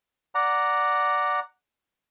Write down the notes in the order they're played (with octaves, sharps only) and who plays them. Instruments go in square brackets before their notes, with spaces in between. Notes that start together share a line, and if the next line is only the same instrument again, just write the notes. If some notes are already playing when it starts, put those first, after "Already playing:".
[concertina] D5 F#5 A#5